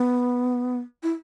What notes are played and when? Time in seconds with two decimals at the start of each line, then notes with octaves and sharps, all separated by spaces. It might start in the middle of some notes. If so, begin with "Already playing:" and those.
Already playing: B3
1.03 E4